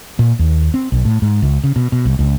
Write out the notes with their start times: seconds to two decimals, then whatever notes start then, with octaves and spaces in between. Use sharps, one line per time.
0.19 A#2
0.39 D#2
0.74 C4
0.92 B1
1.05 A2
1.22 G#2
1.42 C#2
1.64 C#3
1.76 B2
1.92 B2
2.05 C2
2.19 C#2